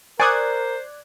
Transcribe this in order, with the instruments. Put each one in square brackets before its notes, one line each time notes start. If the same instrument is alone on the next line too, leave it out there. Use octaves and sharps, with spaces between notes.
[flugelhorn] A#4 [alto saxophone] C5 [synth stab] D5 F#6 G#6 [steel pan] G#5 C#6 D#6